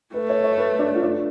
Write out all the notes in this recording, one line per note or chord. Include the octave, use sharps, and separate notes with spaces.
A3 B4
C#5
C#5
B4
D4
F4
D4